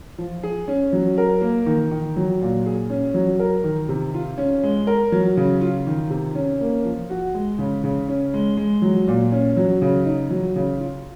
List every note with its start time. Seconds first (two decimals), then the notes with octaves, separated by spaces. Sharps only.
0.18 F3
0.43 G#4
0.68 C#4
0.93 F#3
1.18 A#4
1.42 A#3
1.66 D#3
1.91 D#3
2.17 F#3
2.41 A#2
2.66 G#4
2.90 C#4
3.14 F#3
3.39 A#4
3.64 D#3
3.89 C3
4.14 F4
4.38 C#4
4.63 G#3
4.87 A#4
5.12 F#3
5.37 C#3
5.61 F4
5.87 D#3
6.10 C3
6.35 C#4
6.61 A#3
6.85 F3
7.10 F#4
7.34 G#3
7.59 C#3
7.83 C#3
8.08 C#4
8.34 G#3
8.57 G#3
8.82 F#3
9.08 A#2
9.32 C#4
9.57 F#3
9.82 C#3
10.05 D#4
10.30 F#3
10.56 C#3
10.80 F4